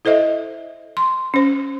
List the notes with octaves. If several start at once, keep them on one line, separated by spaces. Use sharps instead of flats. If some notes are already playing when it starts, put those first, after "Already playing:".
E4 A4 C5 D#5 E5
C6
C#4 C5